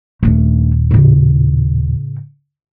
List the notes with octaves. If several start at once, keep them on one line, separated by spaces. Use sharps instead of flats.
D#1 A3 D4
A2 C#3